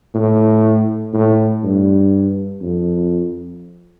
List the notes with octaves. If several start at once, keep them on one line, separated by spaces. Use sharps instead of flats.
A2
A2
G2
F2